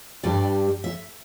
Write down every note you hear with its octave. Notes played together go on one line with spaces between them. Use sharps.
G2 G3 D4 D5
E5